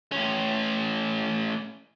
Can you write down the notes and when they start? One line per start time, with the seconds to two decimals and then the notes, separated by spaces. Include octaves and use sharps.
0.12 A2 C#4